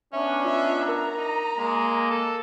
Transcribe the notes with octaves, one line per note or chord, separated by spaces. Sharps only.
B3 C#4 D4 E5
F4 D#5 E5
A#4 A#5
D#4
G#3 A#3
A4